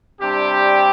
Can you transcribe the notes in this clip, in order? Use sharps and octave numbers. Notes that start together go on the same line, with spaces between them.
C3 G3 D4 G4